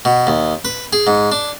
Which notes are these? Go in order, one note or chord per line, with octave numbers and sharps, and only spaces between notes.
B2
D#2
B4
G#4
G#2
D4